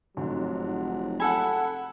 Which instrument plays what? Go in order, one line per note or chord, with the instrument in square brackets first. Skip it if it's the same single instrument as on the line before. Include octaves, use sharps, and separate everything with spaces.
[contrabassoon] F1 [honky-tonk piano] G#2 D3 [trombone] F#3
[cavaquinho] A4 G#5 [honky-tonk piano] F#5 B5